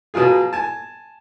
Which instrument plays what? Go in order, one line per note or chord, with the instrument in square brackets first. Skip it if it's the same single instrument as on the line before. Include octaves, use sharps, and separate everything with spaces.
[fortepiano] B2 F#3 F4 G#4
G#5 A5